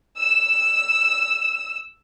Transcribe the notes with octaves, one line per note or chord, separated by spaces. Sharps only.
E6 E7